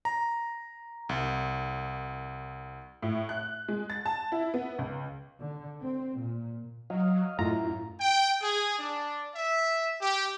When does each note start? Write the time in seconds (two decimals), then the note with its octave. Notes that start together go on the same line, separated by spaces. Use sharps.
0.05 A#5
1.09 C2
3.03 A2
3.29 F#6
3.68 G#3
3.90 A6
4.06 A5
4.32 E4
4.54 B3
4.79 C#2
5.40 D3
5.82 C4
6.18 A#2
6.90 F#3 D#5 F5
7.39 F#2 A2 E4 F4 A#5
8.00 G5
8.41 G#4
8.78 D4
9.35 E5
10.00 G4